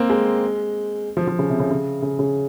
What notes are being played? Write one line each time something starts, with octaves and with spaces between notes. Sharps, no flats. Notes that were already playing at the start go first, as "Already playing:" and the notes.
Already playing: A#3 C4
G#3
F3
F3
C#3
C3
C#3
C#3
C#3
C#3